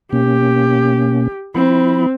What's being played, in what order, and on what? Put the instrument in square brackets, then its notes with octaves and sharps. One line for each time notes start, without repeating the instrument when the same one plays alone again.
[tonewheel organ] B2 A#3 C#4 [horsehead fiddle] G4
[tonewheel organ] F3 E4 B5 [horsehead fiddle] C4